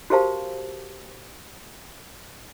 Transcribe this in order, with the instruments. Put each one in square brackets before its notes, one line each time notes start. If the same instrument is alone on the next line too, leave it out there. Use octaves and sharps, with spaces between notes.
[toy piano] F#4 G4 A#4 C5 F5 A5